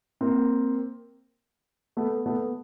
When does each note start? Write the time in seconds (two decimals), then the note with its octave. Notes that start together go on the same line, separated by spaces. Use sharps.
0.21 A#3 C4
1.97 A3 B3
2.26 A3 B3